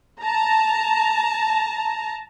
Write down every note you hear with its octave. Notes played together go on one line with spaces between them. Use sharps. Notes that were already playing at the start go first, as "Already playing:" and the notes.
A5 A#5